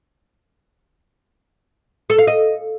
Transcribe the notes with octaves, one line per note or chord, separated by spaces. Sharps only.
A4
F5
D#5